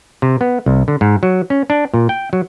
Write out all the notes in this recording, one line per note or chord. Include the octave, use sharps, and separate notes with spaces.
C3
B3
C2
D3
G#2
F#3
C#4
D4
A#2
G5
F#3